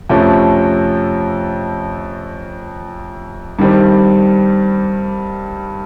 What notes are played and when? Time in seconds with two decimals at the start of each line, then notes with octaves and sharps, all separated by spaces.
0.10 F2 C3 F3 A3 C#4
3.59 G2 D#3 G3 C4